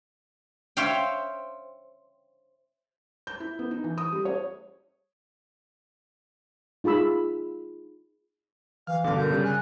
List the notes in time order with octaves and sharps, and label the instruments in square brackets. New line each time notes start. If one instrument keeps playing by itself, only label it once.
[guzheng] C5 C#5 E5 F5 G5
[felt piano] G6
E4
B3
D#4
E3
D#6
G3
C#5
[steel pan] D#4 F4 G#4 B5 E6
[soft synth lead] E3 [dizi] F5 [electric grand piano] F6
[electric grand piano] G2 B2 D3 [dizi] F5 [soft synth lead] D6
[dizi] A#4 [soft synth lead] G6
[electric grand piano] C#3 G3
[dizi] G#5 [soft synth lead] F#6